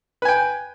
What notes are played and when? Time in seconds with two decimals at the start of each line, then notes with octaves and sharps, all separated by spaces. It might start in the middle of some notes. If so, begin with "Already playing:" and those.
0.22 B4
0.25 G#5
0.28 G5